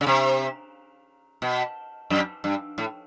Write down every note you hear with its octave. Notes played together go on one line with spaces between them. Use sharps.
C#3
C3
B2
F#2
G2
A2